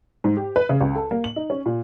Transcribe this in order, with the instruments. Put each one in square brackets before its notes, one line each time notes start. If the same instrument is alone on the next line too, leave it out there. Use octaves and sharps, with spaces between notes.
[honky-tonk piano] G#2
G4
B4
C#3
C#2
A4
A#3
F#7
D#4
C#4
A#2